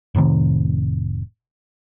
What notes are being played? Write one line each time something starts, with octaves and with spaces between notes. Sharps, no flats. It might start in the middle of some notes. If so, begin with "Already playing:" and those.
F1 A2 C3 D#3